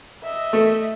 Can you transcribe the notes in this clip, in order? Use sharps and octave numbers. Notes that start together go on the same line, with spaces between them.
D#5 E5
A3